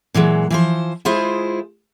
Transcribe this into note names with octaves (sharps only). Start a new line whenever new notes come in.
A#2 E3 F#3 G#3
E3 F3 C5
G#3 E4 F4 G#4 C5